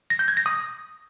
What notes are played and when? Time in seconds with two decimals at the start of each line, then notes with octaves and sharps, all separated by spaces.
0.10 A#6
0.19 G6
0.28 G#6
0.37 A#6
0.46 D#6